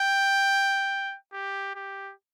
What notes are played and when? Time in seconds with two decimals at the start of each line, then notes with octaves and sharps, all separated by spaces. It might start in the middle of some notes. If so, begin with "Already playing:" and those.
Already playing: G5
1.33 G4
1.75 G4